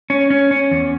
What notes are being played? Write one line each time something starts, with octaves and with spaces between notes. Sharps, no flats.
C#4
C#4
C#4
E2